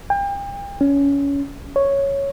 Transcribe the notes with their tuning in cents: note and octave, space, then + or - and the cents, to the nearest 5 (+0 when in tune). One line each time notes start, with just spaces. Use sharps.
G5 +35
C#4 +20
C#5 +0